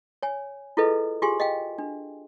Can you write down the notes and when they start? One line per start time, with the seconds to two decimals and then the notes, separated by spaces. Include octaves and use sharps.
0.23 C#5 G#5
0.77 E4 F4 G#4 A4 B4 D#5
1.22 F4 G4 G#4 G#5 C6
1.40 D#5 F5 G5
1.78 D4